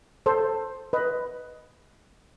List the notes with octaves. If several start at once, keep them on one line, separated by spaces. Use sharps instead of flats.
A4 C5
B4 D#5